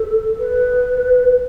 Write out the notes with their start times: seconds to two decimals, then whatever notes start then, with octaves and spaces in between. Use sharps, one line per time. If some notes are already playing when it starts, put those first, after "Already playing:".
Already playing: A4
0.39 B4